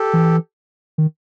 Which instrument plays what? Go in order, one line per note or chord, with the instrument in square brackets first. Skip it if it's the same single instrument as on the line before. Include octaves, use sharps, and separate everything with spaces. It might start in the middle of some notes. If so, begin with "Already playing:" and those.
Already playing: [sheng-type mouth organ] G4 A4
[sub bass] E3
D#3